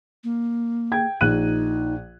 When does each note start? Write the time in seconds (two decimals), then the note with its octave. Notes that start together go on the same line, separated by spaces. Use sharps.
0.24 A#3
0.92 G5 G#6
1.21 A#1 D#4 F#6 D#7